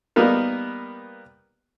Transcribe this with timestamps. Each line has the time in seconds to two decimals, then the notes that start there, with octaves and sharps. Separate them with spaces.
0.16 G3 A#3 B3 D#4 A#4